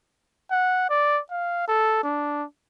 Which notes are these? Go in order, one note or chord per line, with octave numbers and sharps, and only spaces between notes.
F#5
D5
F5
A4
D4